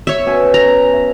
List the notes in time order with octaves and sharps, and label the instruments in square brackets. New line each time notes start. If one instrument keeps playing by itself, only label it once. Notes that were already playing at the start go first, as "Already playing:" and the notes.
[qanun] C#5 E5
[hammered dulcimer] B2 C#4 G#5
[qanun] A#5
[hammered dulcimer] E5